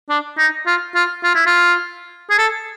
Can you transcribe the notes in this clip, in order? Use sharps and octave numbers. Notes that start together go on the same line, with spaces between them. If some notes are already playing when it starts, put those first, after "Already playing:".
D4
D#4
F4
F4
F4
E4
F4
G#4
A4